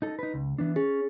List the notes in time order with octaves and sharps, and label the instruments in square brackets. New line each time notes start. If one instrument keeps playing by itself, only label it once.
[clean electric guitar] D#4 A4
D#4 B4
C#2
E3 B3 D4
[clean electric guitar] C#4 [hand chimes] G#4